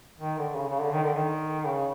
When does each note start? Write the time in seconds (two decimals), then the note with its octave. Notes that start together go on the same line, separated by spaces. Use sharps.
0.20 D#3
0.38 D3
0.57 C#3
0.69 C#3
0.81 D3
0.93 D#3
1.05 D3
1.16 D#3
1.67 C#3